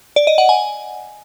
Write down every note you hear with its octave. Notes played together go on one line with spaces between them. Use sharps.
D5
D#5
F#5
G#5